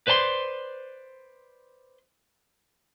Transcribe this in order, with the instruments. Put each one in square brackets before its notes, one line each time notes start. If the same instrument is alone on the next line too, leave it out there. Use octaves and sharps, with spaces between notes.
[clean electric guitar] B4 C5 D5 A5 C6